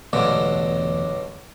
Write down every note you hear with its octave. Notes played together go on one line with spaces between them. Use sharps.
E1 B1 E2 G2 D3 A3 C#5